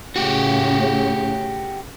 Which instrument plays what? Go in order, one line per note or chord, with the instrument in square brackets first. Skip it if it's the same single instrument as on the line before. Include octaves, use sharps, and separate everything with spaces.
[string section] A2 C#3 [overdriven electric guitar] F#4 G4